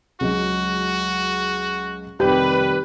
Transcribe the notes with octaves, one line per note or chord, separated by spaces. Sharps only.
C#2 F#3 G#3 F#4
F1 D#3 G3 D#4 G4 B4 G6